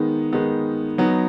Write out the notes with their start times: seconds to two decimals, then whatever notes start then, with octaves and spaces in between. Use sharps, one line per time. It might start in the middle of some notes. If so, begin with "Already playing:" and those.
Already playing: D#3 G#3 B3 D#4
0.33 D#3 G#3 B3 D#4
0.98 F#3 B3 D#4